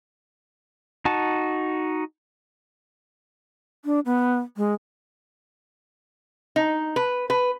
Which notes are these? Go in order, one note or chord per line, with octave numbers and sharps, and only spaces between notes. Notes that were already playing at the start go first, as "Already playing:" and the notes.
D#4 F#4 A5
D4
B3
G#3
D#4
B4
B4